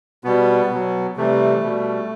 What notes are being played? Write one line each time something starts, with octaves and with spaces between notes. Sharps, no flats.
B2 G3 B3
B2 F#3
C3 E3 G3 A3
B2 G3